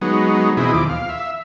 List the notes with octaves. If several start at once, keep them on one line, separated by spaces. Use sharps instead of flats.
F#3 G#3 B3 D#4
B2 E3 C4 E4 G#4 D#5
D#2 F3 D6
F5
E5